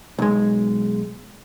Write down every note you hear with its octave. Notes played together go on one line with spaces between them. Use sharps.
B1 G#3